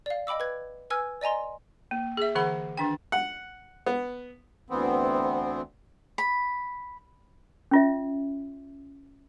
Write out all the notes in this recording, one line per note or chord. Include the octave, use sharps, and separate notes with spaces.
D5 F5
D#5 G5 B5 D6 E6
B4 G#6
B4 G#5 E6 F6 G#6
D5 D#5 G#5 A#5 C6
A#3
G#4 E5
D3 E3 G#4 F#5 B5
D#3 D4 G5
F#5
B3
D2 E3 B3 C4
B5
C#4 F4 E5